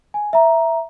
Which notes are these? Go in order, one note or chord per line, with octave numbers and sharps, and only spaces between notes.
G#5
E5 A#5